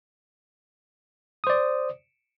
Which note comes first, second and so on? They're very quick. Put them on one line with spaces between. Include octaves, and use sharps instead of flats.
D#6 C5 D5